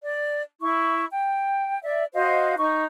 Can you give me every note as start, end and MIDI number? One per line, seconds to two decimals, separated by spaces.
0.04 0.41 74
0.61 1.05 64
0.61 1.05 85
1.11 1.82 79
1.83 2.04 74
1.83 2.04 76
2.14 2.54 66
2.14 2.54 72
2.14 2.54 75
2.14 2.54 77
2.58 2.83 63
2.58 2.83 85